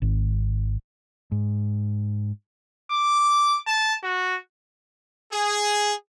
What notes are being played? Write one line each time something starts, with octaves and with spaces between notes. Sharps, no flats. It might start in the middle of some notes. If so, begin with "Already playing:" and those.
G#1
G#2
D6
A5
F#4
G#4